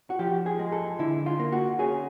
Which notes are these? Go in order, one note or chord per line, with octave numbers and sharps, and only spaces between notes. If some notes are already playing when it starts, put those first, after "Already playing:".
F#4
F3 G4
G#4
G#3
A4
D3 E4
F4
A#3
F#4
C#4 G#4